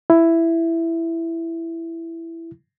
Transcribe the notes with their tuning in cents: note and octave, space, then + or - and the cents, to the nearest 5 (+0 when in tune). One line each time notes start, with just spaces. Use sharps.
E4 +10